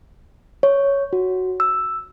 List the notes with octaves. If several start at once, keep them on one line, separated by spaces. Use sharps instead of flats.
C#5
F#4
E6